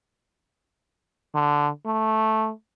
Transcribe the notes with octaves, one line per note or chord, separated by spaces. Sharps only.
D3
A3